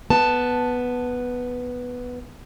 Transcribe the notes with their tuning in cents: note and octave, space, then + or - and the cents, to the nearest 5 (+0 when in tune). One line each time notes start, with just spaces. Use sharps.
B3 +0 A5 +0